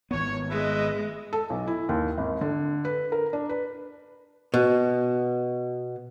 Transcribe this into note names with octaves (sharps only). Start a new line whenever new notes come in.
G#1 B3 C#5
G#3 B4 D#5 E5
A4
B1
E4
D#2
G#1
D3
B4
A#4
D4
B4
B2